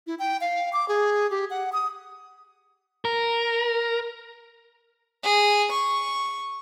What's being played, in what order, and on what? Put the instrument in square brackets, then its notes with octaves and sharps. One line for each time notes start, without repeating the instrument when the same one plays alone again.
[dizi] E4
G5
F5
D6
G#4
G4
F#5
D#6
[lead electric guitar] A#4
[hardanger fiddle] G#4
C#6